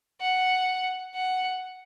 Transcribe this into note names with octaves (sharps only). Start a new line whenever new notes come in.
F#5
F#5